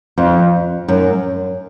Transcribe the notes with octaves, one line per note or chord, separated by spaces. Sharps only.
F2
F#2